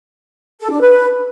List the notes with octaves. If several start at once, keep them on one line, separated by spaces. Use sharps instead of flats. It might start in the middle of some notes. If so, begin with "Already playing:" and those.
A4
D4
B4